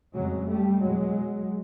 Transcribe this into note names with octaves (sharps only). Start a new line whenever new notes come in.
F2 C#3 F#3 G#3
G3 A3
E2 B2 F#3 G#3